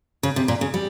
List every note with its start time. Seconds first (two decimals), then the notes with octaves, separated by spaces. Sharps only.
0.23 C#3
0.36 C3
0.48 A#2
0.61 C#3
0.74 G3